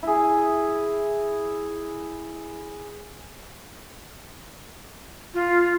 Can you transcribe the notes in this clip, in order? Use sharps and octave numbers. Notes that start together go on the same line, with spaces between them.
E4 G#4
F4